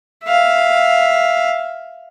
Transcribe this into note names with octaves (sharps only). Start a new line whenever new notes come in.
E5 F5